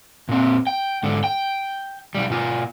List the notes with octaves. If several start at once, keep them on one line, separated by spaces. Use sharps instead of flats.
A#2 C4
G5
G#2 D3
G5
B1 G3
B2 F4